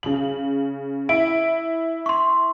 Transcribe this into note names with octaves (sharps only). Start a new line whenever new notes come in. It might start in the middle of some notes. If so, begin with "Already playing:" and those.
C#3 F#7
E4 D7
C6 C#6